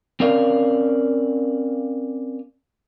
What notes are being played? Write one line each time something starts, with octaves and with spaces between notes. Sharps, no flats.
C4 C#4 A#4 D5 F5